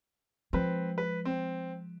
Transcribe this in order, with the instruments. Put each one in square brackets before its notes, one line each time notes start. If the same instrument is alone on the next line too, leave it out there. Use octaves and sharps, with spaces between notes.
[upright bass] F3 G#3 [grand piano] C4 B4
[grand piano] B4
C4